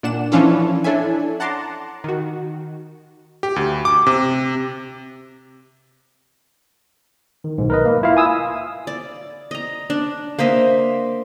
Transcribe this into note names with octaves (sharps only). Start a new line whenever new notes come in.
A#2 D4 F#5 E7
E3 F3 C#4 D4 F4 A4
D4 E4 A4 C#5 E5 G#5
F#5 A5 A#5 C6 D6
D#3 F#4
G4
D2
D6
C3
D#3
B1 G#2
A#4 B4 D#5
A#3
E4 F4 F5
G#5 D#6 E6
D5
D#5 A#5
D4
A#3 C5 D#5 E5